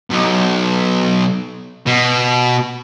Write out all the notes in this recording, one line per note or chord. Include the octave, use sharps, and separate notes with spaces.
B1
B2